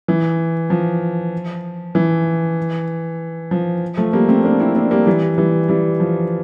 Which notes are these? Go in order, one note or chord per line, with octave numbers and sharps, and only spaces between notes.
E3
F3
E3
F3
F3 A3
G3 A#3
A3 C4
A#3 D4
C4 E4
A#3 D4
G3 A#3
E3 G3
E3 G3
E3 G3
F3